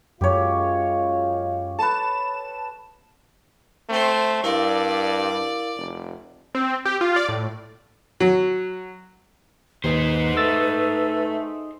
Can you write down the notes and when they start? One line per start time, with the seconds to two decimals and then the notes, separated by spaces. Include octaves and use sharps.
0.21 F#2 G#3 F4 G4 C#5 F5
1.79 A4 B4 A5 E7
3.89 A3 C4 C5
4.44 G2 E4 A#4 D5 F5
5.77 F1
6.55 C4
6.85 G4
7.01 F4
7.16 D5
7.29 A2
8.20 F#3
9.84 D#2 D#4 G#4 B4 C5
10.37 A3 E6 A6